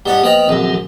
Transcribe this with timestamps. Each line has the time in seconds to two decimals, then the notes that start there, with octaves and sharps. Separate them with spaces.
0.06 G2 B3 C#4 G4 D#5
0.24 F3 A#3 B3 B4 D#5 G5
0.49 A#1 F#2 D#3 C4 A4